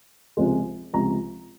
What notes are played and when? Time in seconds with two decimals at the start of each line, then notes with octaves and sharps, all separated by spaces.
0.37 C#2 C3 F3 G#3
0.93 C#2 C3 F3 G#3 A#5